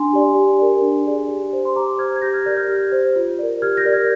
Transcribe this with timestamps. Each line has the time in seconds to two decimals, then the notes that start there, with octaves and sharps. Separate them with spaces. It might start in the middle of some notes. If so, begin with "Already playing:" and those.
Already playing: D4 G#5 C6
0.13 G4 D5
0.35 G4
0.59 A#4 D5
0.82 D4
1.06 G#4 D5
1.29 G4
1.53 C5
1.65 C6
1.75 G4 A#5 D6
1.98 C5 F6 G#6
2.16 G#6
2.22 G4 G6 A#6
2.34 F6 G#6
2.46 A#4 D5 G6 A#6
2.57 F6 G#6
2.68 G4
2.92 C5
3.16 F4
3.39 A#4 D5
3.62 G4 F6 G#6
3.77 G6 A#6
3.85 A#4 D5
3.93 F6 G#6